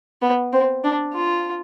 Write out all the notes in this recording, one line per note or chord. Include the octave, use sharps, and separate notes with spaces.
B3
C4
D4
F4